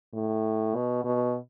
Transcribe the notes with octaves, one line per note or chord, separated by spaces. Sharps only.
A2
B2
B2